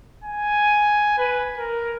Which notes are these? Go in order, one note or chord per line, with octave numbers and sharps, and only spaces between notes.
G#5
B4
A#4